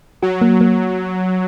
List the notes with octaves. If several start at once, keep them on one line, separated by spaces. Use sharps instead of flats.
F#3 F#4
A#3
A#3